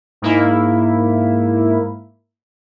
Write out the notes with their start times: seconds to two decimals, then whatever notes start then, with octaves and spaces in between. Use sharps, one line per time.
0.22 G#2 A#3 E4